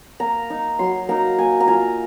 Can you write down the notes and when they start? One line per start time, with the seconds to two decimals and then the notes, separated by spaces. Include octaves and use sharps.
0.20 A#3 A#5
0.50 D#4
0.79 F#3 C6
1.09 A#3 D#4 A#5
1.38 A#3 G#5
1.60 A#5
1.68 F4 G#5